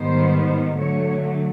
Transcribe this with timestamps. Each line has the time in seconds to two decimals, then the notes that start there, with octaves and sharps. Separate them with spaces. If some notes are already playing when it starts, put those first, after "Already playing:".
Already playing: G#2 D#3 G3 B3 C5
0.79 D3 F#3 A3 C#5